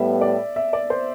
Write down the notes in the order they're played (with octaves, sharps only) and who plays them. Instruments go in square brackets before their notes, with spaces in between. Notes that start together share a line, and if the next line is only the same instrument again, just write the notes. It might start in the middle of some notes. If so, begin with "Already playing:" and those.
Already playing: [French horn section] A2 G3 B3 [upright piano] E5
[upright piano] D5
E5
D5
C5